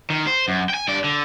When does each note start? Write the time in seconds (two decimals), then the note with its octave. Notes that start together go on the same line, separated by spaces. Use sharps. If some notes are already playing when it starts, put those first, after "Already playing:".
0.10 D#3
0.27 C5
0.48 F#2
0.70 G5 G#5
0.88 G2 D5
1.04 D3